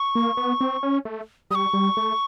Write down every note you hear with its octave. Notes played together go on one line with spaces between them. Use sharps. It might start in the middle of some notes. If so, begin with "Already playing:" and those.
Already playing: C#6
A#3
B3
C4
C#4
A3
G3 C#6 D#6
G3
A3